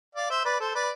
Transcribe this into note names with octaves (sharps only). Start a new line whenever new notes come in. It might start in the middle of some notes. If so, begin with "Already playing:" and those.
D5 F5
C5 E5
B4 D5
A4 C5
B4 D5